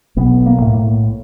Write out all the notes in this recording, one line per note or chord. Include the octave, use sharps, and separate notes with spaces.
B1 B3
A#3
A2